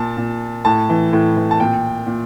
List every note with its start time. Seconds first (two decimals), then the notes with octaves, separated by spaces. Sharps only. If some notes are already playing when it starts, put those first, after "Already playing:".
Already playing: A#2 A5
0.17 A#2
0.65 A2 A5
0.89 E3
1.13 A2
1.37 E3
1.51 A5
1.60 A#2 G5
2.07 A#2